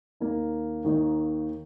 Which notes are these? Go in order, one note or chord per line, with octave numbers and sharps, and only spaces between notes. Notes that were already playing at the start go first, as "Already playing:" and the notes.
D#2 D#3 A#3 D#4
D#2 D#3 A#3 D#4